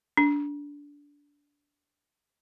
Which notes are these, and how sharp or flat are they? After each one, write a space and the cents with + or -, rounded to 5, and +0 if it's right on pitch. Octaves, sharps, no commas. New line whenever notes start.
D4 -20